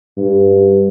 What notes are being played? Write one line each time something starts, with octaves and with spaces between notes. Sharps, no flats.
G2